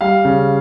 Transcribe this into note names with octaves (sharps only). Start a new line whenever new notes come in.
G3 F5
C#3